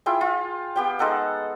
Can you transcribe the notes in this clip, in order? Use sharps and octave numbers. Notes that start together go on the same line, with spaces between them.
E4 F4 G#4 G5
F4
B3 G4 G5
G#3 D#4 A4 F#5